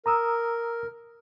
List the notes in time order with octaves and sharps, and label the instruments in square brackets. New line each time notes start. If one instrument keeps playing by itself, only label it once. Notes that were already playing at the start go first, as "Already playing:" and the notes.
[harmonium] A#4 [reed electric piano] A#5 D#6 E6